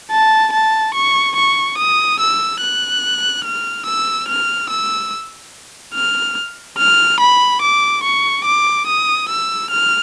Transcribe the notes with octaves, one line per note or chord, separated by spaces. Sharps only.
A5
A5
C#6
C#6
D#6
E6
F#6
F6
E6
F6
E6
F6
F6
B5
D6
C#6
D6
D#6
E6
F6